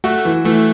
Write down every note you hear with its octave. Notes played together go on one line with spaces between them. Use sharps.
A3 F#4
E3
E3 A3